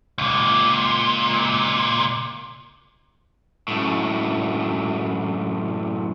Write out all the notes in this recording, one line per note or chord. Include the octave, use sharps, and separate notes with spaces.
C#2 A#2
F#2 A2